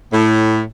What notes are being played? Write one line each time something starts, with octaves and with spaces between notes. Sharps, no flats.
A2